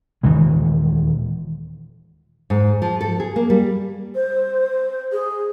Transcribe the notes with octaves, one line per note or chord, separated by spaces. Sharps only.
D#1 D#3 E3 G#3
G#2
F3
A4
G#4
A#3
G3
C5
G#4